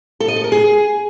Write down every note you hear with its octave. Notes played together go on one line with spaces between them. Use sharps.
A4
D#5
A4
A#4
G#4